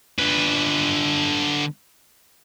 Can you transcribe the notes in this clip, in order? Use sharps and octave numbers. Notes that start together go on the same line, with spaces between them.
D3 B4